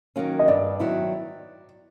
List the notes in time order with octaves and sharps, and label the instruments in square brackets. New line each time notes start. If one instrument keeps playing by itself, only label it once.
[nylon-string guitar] D#3 F#3 A#3 C#4
[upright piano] D#5
[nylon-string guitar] G2 [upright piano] D5
[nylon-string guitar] D#3 F#3 B3 E4